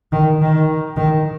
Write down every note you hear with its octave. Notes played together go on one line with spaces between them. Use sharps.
D#3
D#3
D#3